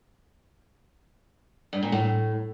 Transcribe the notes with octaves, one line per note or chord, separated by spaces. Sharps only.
G2
A#2
A2